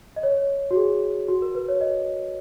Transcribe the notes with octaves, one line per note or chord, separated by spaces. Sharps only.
D#5
C#5
F#4
G#4
F#4
A#4
B4
C#5
D#5